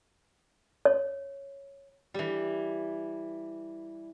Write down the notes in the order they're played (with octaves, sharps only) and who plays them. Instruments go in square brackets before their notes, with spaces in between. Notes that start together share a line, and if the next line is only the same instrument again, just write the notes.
[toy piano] C#5
[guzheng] E3 G3